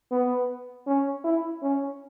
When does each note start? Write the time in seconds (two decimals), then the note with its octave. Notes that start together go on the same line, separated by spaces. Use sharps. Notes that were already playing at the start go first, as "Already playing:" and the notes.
0.11 B3
0.87 C#4
1.24 E4
1.62 C#4